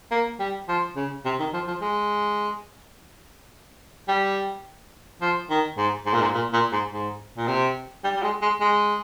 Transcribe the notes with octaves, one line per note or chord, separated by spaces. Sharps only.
A#3
G3
F3
C#3
C3
D#3
F3
F3
G#3
G3
F3
D#3
G#2
G#2
A#2
G#2
A#2
A#2
G#2
G#2
A#2
C3
G3
G3
G#3
G#3
G#3